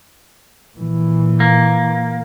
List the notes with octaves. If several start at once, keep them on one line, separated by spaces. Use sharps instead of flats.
A#2 E3
A#3